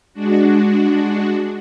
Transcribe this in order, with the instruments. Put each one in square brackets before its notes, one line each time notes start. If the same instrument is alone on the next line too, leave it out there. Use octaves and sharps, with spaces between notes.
[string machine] G#3 D4 F#4